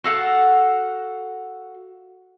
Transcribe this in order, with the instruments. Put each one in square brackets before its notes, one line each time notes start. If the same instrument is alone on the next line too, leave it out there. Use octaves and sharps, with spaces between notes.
[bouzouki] F#4 A4 F5 F#5